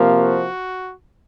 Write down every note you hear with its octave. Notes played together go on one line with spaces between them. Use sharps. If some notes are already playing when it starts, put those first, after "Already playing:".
Already playing: C3 F3 A#3
F#4